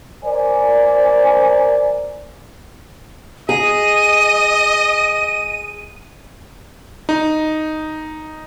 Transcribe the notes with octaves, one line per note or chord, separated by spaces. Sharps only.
A#4 C5 D5 G#5
G#4 D#5 D#7
D#4